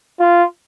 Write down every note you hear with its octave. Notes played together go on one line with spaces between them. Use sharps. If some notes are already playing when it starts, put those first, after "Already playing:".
F4